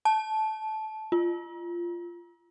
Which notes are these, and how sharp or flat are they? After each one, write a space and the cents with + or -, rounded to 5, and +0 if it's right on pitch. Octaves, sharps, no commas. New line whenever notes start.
A5 -15
F4 -15